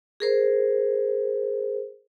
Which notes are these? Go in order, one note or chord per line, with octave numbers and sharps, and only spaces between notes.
G#4 A#4 C5